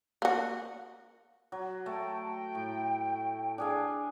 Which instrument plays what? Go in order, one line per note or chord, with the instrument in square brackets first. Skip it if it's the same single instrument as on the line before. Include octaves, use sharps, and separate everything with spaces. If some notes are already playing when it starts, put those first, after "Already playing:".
[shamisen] A#3 F#4
[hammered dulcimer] F#3
[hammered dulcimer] A3 A5 [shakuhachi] G5
[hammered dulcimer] A2
D4 G#4 F5